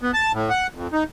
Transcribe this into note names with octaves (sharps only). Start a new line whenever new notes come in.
B3
A5
A2
F#5
F2
D#4